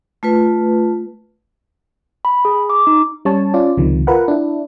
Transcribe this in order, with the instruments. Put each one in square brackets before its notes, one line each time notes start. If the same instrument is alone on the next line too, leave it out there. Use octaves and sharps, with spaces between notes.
[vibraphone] A3 F4 B4
[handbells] B5
G#4
D6
D#4
[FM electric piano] G3 C#4 C#5 A5
C#4 F4 D5
C#2 C3 D#3 F3
F4 A#4 B4 F#5
D4 E4